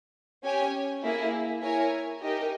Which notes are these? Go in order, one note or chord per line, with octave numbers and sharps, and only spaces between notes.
C#4 G4 C#5 G#5
A#3 E4 G#4
E4 A#4 C#5 G#5
D#4 G4 A#4 D#5